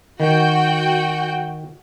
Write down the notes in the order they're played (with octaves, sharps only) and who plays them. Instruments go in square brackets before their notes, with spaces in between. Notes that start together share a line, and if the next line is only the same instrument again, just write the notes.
[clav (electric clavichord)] D#3 [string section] F#4 G5